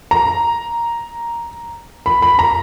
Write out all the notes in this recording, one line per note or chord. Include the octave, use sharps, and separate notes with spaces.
A#5
B5
B5
A#5